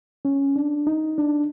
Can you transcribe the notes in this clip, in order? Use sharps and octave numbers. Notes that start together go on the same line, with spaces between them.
C#4
D4
D#4
D4